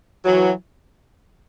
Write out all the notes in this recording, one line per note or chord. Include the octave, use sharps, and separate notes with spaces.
E3 F#3